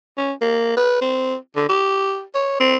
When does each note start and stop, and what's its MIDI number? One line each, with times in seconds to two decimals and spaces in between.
0.18 0.33 61
0.41 0.75 58
0.77 0.97 71
1.01 1.35 60
1.56 1.66 50
1.69 2.22 67
2.35 2.56 73
2.60 2.76 60